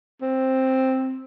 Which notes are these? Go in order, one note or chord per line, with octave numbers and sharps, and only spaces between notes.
C4